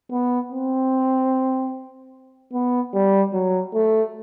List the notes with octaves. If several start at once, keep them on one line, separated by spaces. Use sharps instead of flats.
B3
C4
B3
G3
F#3
A3